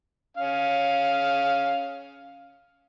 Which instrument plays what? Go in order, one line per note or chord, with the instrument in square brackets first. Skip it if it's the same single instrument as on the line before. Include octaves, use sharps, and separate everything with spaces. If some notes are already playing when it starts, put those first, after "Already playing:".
[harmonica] C#4 F5